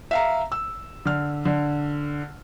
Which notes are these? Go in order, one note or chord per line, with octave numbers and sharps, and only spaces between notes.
E5 F5 A#5
E6
D3 F6
D3